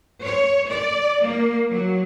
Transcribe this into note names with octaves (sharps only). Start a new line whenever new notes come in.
C#5
D5
A#3
F#3